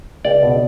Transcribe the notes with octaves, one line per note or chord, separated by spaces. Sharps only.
C#2 D5
B2